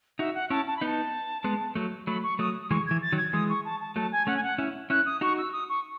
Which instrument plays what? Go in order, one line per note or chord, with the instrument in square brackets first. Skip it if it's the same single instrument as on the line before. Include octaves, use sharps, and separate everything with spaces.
[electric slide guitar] D#4 F#4 [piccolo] E5
[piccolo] F#5
[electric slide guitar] C#4 E4 [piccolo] A5
[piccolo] A5
B5
[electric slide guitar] B3 D#4 [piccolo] A5
[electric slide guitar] G#3 B3
F#3 A3
[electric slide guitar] F#3 A3 [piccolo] B5
[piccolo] C#6
[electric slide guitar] F#3 A3 [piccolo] D#6
[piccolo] D#6
[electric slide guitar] E3 G#3 [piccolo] C#6
[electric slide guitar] E3 [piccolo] G#6
[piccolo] A6
[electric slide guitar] D#3 F#3
[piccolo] G#6
[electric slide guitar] E3 G#3 [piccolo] D#6
[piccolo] C#6
A5
A5
[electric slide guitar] F#3 A3 [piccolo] A5
[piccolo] G#5
[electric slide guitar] A3 C#4 [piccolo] F#5
[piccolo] G#5
F#5
[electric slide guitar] C#4 E4
[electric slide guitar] C#4 E4 [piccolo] F#6
[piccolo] D#6
[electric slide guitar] D#4 F#4 [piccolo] C#6
[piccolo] E6
D#6
C#6